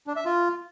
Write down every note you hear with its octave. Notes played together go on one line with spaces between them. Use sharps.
D4
E5
F4